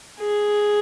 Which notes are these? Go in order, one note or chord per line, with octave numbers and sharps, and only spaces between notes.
G#4